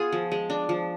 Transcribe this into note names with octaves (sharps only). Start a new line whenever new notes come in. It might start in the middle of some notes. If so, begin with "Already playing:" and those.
Already playing: B3 F4 G#4
F3
G#3
D4
F3